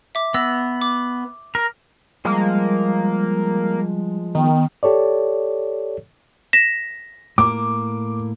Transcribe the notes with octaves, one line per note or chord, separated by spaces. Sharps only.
E5 D6
B3 E6 A#6
D6
A#4
F3 G3 G#3 A#3
D#3 B3 G5
G4 A4 C#5 D5
A#6 B6 E7
A2 A#3 A#4 D6